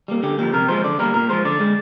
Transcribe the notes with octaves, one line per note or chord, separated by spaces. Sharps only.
G3 A#3
D3 G4
F3 A#3 G4
C3 A#4
F3 G#3 C5
D3 D5
G3 A#3 A#4
A#2 A#4
F3 G#3 C5
D3 D5
G#3